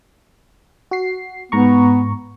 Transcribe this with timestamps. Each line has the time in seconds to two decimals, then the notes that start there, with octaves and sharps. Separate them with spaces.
0.91 F#4 C7
1.52 G#2 B3 A#5 C#6